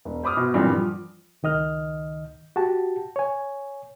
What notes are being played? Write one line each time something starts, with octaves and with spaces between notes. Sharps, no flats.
E1
C5 B5 D6 D#6 F6
B2
G2 A#2 E3 F#3 G3 C4
F3
C#2 D#3 D#5 F6
F#4 G4 A5
C#5 G#5